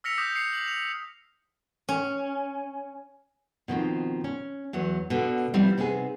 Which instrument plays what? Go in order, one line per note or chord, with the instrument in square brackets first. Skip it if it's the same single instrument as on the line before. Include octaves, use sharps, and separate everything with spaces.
[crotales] E6 F6 A#6 B6 C#7 F7
D6 D#6 G6 A#6 B6
C7 C#7
F#7
F7
[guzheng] C#4
[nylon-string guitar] B2 D#3 F3 C4
C#4
E2 F#3 B3
B2 D3
F3 G3 B3 C4 D#4 E4
C3 B3 C4 D#4 G#4